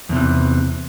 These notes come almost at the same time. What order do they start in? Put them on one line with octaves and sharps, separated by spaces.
E2 C3 E3